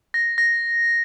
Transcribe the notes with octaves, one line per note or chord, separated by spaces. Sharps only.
A#6
A#6